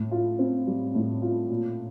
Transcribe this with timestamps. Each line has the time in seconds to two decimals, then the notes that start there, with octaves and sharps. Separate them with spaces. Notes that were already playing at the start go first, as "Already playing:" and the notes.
Already playing: A2
0.11 F4
0.39 C4
0.67 G3
0.95 A2
1.22 F4
1.50 A#2